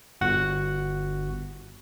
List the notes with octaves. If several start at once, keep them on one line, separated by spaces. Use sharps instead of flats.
G1 F#4 F#5